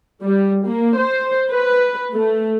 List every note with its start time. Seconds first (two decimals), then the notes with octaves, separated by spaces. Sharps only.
0.24 G3
0.66 A#3
1.00 C5
1.51 B4
2.14 A3